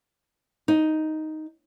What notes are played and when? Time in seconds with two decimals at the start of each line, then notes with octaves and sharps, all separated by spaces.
0.68 D#4